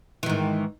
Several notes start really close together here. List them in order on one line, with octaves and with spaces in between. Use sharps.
E3 D#3 G#2